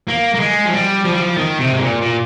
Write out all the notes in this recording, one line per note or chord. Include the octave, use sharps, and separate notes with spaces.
A#3
A#3
G#3
F3
G3
F3
G3
F3
D#3
C3
G#2
A#2
A#2